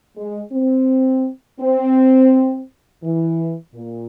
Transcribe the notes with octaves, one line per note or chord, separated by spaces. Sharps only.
G#3
C4
C4
E3
A#2